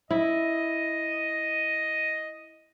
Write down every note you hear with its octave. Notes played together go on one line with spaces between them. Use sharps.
E4 D#5